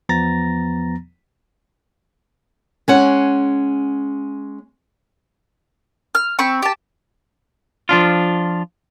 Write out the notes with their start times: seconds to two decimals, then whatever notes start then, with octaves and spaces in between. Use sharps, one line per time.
0.09 E2 F3 B3 A#5 A6 A#6
2.88 G#3 C#4 F#5
6.15 F6
6.39 C4 B5 C#6
6.62 G4 A5
7.89 F3 D4 F4